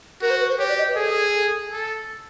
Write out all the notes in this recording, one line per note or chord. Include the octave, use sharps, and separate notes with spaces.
F#4 A#4
C5
B4
C5
G4 C#5
D5
D#5
B4
G#4 A4
A4